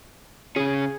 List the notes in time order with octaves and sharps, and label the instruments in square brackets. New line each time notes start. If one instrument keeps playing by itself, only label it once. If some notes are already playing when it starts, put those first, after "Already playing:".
[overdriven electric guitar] C#3 C#4 [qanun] G#4